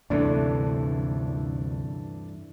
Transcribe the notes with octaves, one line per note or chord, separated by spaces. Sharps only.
D2 G2 C3 E3 A3 D4